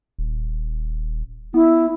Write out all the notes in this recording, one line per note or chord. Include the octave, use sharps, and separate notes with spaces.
D#1
B3 E4